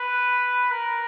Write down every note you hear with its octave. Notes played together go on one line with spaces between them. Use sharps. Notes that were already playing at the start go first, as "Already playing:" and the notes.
Already playing: B4
A#4